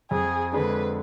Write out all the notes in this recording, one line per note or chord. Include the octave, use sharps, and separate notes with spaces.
F2 G#4
D3 G#3 D4 B4